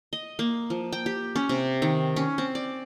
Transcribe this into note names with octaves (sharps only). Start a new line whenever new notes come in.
D#5
A#3
F3
G5
G4
C#4
C3
D#3
C#4
C4
D5